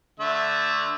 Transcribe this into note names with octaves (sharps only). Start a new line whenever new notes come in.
D3 A3 E5